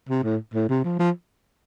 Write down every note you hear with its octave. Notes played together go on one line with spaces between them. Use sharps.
C3
A2
A2
C3
F3
F3